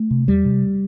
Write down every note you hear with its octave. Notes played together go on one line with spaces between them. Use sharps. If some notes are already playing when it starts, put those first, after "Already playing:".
Already playing: A3
C3
E2 G3
C3